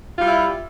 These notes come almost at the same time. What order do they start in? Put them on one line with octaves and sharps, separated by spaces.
F4 G3 E4